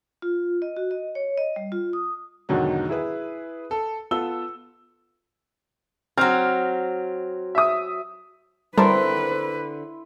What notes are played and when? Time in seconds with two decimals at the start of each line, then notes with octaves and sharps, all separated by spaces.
0.22 F4
0.62 D#5
0.77 F#4
0.91 D#5
1.15 C#5
1.38 D#5
1.56 G3
1.72 F4
1.93 D#6
2.49 E2 G#2 B2 D3 D#3 F#3
2.89 E4 G#4 B4
3.71 A4
4.11 B3 F4 A4 E6 G7
6.18 F#3 C4 F6
7.55 E5 D#6
8.78 D3 G3 C4 E4 A#4 B4 A5 C6